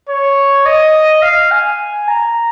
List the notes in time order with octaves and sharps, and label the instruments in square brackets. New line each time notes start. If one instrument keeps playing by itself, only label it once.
[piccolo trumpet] C#5
D#5
F5
G#5
A#5